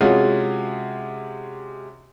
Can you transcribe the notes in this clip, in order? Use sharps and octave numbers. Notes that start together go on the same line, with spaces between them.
C3 G#3 C#4 F4 F#4 G#4